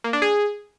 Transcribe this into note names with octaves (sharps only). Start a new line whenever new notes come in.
A#3
D4
G#4